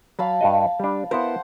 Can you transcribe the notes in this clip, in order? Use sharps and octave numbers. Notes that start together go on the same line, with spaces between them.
F#3 F5 A5 B5
G2 F#4 D#5
G3 D4
B3 E4 A#4 C5 F#5